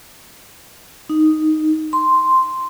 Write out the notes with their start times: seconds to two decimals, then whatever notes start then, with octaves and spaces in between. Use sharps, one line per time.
1.09 D#4
1.93 C6